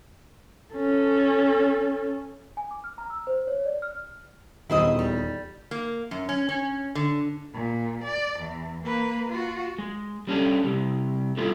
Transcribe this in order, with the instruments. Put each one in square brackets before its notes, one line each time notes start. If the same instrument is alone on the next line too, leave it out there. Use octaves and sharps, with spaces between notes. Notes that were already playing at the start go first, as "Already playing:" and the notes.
[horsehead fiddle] C#4 A4
[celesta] G#5
D6
F6
A#5
E6
C5
C#5
D5
F6
[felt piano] D#1 E2 D#3 [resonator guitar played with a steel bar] E4 C5 D#5
[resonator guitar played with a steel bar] G3
A#3
F#2
C#4
C#4
D3
[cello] A#2
D5
E2
A#3 B4
F4 F#4
[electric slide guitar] G#3
G3 C#4 D4 G4 A4
C3 G3
G3 A3 B3 E4 F4 A4